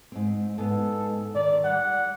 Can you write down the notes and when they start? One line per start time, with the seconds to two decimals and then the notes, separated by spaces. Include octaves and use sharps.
0.12 G#2 C4
0.58 G#2 B3 A4
1.35 D#3 D5
1.64 G3 F#5